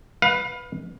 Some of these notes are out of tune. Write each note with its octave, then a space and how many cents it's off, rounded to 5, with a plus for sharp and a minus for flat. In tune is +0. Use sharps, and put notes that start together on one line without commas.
B4 +0 F5 +30